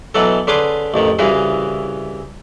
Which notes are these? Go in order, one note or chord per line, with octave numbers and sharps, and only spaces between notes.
B2 E3 F#3 A4
D3 C#4 G#4 B4 C6 D6
A1 F2 D#3
C2 C#3 E3 E4 F#4 G#4